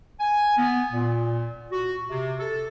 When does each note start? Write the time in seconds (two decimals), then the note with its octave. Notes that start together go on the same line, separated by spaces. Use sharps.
0.20 G#5
0.58 B3
0.91 A#2
1.72 F#4
2.10 C3
2.40 A4